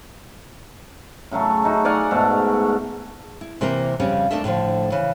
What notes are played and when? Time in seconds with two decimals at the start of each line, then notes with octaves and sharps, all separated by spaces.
1.31 A2 C#3 F#3 A3
1.64 A3 D#4 F#4
1.85 D5 F5 F#5 G#5
2.11 G#2 B2 A3
3.41 E4
3.61 C3 E3 A#3 A#4 C5
4.00 F2 C#3 G3 C#4
4.31 A3 D4 A#4 D#5 E5
4.44 A2 D3 D#3 F3
4.92 C#3 E3